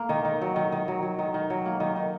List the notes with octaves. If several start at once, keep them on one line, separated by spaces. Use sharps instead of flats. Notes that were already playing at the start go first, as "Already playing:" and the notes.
Already playing: A#3
D#3
D#3
F#3
D#3
D#3
F#3
F#3
D#3
D#3
F#3
A#3
D#3
D#3